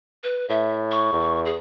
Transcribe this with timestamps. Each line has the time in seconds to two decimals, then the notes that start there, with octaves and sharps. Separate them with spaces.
0.24 B4
0.49 A2 E5
0.91 C#6
1.13 E2
1.46 G#4